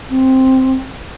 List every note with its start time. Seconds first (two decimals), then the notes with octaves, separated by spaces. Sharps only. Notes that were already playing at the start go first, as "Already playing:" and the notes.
0.10 C4